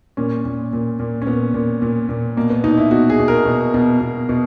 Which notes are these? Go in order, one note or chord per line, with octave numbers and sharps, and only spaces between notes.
A#2 C#4
A#2
A#2
A#2
C#4
A#2 B3
A#2
A#2
A#2
B2 A#3
B3
B2 D#4
E4
B2 F#4
G#4
B2
A#4
B2
B2
B2
B2